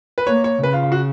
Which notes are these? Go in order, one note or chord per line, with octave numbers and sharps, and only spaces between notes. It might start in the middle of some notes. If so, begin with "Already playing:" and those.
B4
A#3 C#5
C#5
C#3 B4
F4
F4
F#4